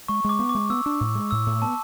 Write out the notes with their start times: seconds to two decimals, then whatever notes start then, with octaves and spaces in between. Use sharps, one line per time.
0.08 G#3 C#6
0.24 G#3 D6
0.39 B3
0.49 D6
0.55 G#3
0.70 B3 E6
0.86 D4
1.00 A2
1.15 G#3
1.31 A2 E6
1.46 A2
1.62 B3 A5